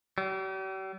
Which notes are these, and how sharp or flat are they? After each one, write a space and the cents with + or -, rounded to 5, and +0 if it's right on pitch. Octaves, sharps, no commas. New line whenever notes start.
G3 -45